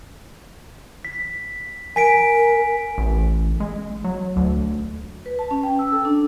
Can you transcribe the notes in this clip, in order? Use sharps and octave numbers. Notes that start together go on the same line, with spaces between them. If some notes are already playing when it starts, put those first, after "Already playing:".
B6
A#4 G#5 B6 D7
A1
G#3
F#3
D2
B4
A5
C#4
G5
E6
A4
D4